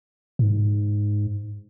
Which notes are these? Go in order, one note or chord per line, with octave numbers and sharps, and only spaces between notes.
G#2